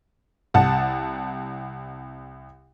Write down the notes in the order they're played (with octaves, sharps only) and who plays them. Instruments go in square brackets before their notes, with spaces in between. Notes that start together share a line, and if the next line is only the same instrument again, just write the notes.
[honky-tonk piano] C2 F#5 A5